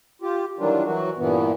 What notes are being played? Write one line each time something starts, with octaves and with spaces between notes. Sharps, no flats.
F4 G4
D#3 E3 F#3 G3 D4 F4
E3 F#3 F#4
G2 A#2 E3 B3